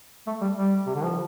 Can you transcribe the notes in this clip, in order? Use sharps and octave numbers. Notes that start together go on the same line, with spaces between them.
A3
G3
G3
C3
D3
F3